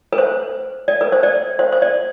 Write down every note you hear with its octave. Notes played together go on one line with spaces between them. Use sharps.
B4
C5
D5
B4
C5
D5
C5
C5
D5